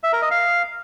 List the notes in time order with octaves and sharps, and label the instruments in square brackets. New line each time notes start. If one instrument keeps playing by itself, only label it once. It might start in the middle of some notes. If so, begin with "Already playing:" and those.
[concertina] E5
A#4
D#5
F5